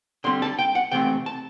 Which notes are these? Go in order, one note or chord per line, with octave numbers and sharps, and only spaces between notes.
D3 G3 C4 C6
A5
G5
F#5
C3 E3 A3 C4 G5
A5